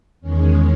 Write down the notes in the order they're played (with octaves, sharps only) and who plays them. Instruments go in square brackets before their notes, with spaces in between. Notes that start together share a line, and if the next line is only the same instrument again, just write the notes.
[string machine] E2 D#3 G#3 C#4